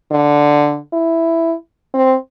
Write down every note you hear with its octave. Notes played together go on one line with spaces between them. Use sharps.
D3
E4
C4